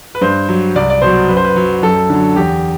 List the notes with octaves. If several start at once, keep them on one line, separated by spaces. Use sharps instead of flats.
B4
G2 C5
F#3
C2 D5
D5
B2 F#3 C5
F#2 B4
C5
B4
F#3
F#2 A4
D3 F#3
E2 G4